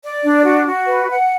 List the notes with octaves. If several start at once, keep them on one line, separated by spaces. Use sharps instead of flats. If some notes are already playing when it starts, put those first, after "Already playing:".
D5
D4
F#4
F#4
B4
F#5